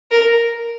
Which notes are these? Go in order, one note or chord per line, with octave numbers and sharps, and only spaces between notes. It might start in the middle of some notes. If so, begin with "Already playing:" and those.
A#4